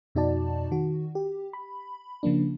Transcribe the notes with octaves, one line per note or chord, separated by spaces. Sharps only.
F2 B2 D#4 F#4 D5 A5
D#3 F#4
G4
B5
C#3 F3 A#3 D4